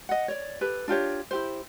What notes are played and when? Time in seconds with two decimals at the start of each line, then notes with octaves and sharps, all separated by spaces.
0.09 D#5 F#5
0.28 C#5 D5
0.61 G4 A4 B4
0.88 D4 F4 G4 C#5
1.31 E4 G4 C5